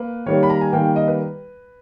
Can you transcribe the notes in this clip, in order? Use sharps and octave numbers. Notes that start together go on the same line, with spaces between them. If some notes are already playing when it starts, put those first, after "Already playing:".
Already playing: A#3 B4
D#3 G3 A#3 C#5
B5
A#5
G#5
D#3 G3 A#3 G5
D#5
B4